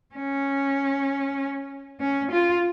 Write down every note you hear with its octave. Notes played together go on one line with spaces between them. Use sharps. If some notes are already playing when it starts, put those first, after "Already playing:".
C#4
C#4
F4